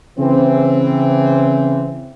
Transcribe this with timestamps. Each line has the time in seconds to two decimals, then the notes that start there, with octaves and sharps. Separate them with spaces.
0.18 C#3 E3 C4